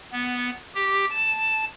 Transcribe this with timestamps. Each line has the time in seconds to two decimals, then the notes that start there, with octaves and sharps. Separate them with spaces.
0.12 B3
0.75 G4
1.10 A5